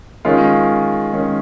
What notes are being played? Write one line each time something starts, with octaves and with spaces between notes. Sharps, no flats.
D#3 G#3 C#4 F4
D#3 G#3 C#4